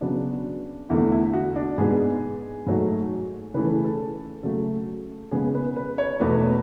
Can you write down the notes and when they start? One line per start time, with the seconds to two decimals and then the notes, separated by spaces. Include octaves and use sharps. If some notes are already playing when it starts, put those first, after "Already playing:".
0.01 C#3 F#3 B3 D4
0.89 E2 D3 A3 E4
1.12 E4
1.33 F#4
1.56 D4
1.78 G#2 G#3 B3 G#4
2.66 G#2 F#3 A3
3.54 C#3 E3 A3 B4
3.65 A4
3.75 G#4
3.85 A4
4.43 C#3 F#3 A3 A4
5.31 C#3 G#3 B3 G#4
5.54 B4
5.76 B4
5.98 C#5
6.20 E2 B2 A3 B4